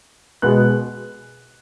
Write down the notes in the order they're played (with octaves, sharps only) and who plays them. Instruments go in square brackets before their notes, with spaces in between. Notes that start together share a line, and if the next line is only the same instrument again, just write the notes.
[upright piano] B2 G#3 B3 F#6